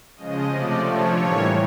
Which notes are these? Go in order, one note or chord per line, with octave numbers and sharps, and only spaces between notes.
C#3 F3 G#3 D#5
C3 F3 A3 D5
D3 F3 A3 C#5
A2 E3 G3 A#3